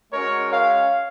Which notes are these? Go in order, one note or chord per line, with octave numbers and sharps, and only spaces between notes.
G#3 C#4 F#4 A#4 C#5
C#5 F5